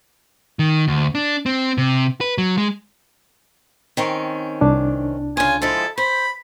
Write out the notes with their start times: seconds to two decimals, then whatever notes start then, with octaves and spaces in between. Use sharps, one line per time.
0.59 D#3
0.88 D2
1.15 D4
1.46 C4
1.78 C3
2.21 B4
2.38 F#3
2.58 G#3
3.97 D#3 C4 C#4
4.61 C2 D4
5.37 C#3 F4 G#5
5.62 F3 G#3 E4 A4
5.98 C5 B5